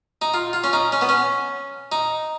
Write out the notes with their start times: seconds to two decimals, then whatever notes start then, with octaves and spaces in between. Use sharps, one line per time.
0.22 D#4
0.34 F4
0.53 F4
0.64 C#4
0.73 D#4
0.92 C#4
1.01 B3
1.09 C#4
1.92 D#4